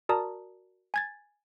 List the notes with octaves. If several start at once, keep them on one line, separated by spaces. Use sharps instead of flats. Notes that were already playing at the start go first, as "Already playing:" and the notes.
F#4 A#4 D5 A5 A#5 D#6
G#5 G#6 A6